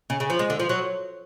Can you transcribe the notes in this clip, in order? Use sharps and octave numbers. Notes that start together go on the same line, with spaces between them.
C#3
C#3
F3
G#3
D3
F3
F#3